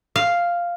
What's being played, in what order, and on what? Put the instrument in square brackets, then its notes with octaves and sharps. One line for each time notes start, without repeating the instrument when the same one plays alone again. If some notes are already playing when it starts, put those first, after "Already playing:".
[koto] F5